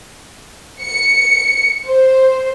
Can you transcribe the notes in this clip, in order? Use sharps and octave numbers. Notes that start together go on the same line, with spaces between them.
C#7
C5